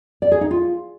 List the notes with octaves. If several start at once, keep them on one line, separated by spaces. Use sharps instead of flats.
D5
G#4
D#4
F4